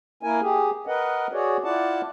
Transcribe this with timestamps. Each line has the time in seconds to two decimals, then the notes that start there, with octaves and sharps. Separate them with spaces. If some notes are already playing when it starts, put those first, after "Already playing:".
0.23 A#3 E4 A#4 G#5
0.41 G4 G#4
0.87 A#4 B4 D#5 F#5
1.32 F#4 G#4 C#5 D5
1.64 E4 F4 D5 F#5 A5